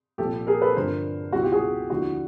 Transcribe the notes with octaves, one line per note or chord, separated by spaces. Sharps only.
C2 A#2 F3 G4 A4
G#4 A#4
A4 B4
G2 D3 F3 A#4 C5
C#2 B2 F#3 E4 F#4
F4 G4
F#4 G#4
D#2 D3 F3 E4 F#4